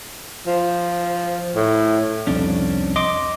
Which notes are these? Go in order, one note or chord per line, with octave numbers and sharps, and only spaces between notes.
F3
A2
C2 F2 C#4 D4
D#5 C6 D6